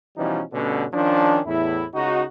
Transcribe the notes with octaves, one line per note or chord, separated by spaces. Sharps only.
B2 E3 F3 G3 C#4 D#4
G2 B2 D3 A3 C#4
D#3 F3 C#4 D4
E2 A2 E4
C#2 D#4 F#4